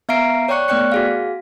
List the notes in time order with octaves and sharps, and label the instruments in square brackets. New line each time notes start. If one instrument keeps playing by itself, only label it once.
[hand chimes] B3 E5 F5 A#5 C7 D7
C#5 D5 G5 C#6 F#6 C#7
A3 B3 D5 G5 F#6 C#7
F#4 G#4 F5